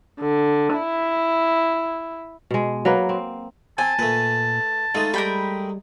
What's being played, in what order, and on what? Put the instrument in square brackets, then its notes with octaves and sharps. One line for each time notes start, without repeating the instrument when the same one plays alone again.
[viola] D3
E4
[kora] B2 G#3
F#3 A#3 B4
C4
[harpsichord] C4 [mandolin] G#5 [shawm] A5
[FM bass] A#2 [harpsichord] A3 B4
[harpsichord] G#3 A3 G#4 [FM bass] D#4 [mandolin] F4
[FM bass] G3 [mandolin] A#4 G5 B5